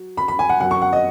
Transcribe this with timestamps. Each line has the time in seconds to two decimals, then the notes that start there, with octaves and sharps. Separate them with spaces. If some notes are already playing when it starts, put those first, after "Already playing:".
Already playing: F#3
0.17 B5
0.28 B5
0.39 G#5
0.49 F#5
0.60 F#2 F#5
0.65 F#3
0.71 C#6
0.82 F#5
0.93 D#5